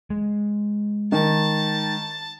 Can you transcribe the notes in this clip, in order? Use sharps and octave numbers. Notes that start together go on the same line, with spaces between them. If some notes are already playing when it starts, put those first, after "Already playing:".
G#3
D#3 A5